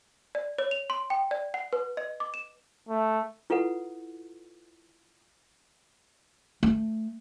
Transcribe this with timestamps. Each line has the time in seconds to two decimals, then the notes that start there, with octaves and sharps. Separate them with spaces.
0.35 D5
0.59 C#5
0.71 F7
0.90 C6
1.10 G5
1.31 D5
1.54 F#5
1.73 B4
1.97 D#5
2.20 D6
2.34 E7
2.89 A3
3.50 E4 F4 A4 B4 F#5
6.63 A3